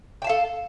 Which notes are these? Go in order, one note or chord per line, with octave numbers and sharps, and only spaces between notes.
A4 F5 G5 A5